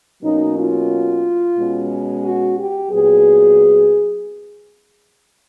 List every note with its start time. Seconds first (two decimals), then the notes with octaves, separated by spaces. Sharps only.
0.22 B2 F#3 A#3 C#4 D#4
0.56 F4
1.56 B2 G#3 C#4
2.24 F#4
2.57 G4
2.90 A#2 F#3 B3 G#4